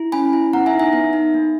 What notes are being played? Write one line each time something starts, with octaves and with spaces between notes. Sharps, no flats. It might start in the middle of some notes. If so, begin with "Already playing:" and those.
Already playing: E4
C#4 G#5 B5
E4
B3 F#5 A#5
E5 G#5
D#4
E5 G#5
B3
D#4
A#3